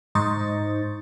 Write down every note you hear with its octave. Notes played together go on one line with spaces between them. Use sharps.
G#2 D#4 C5 D#5 C#6 A6